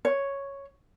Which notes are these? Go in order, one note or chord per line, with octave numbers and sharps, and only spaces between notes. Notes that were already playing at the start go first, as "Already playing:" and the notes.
C#5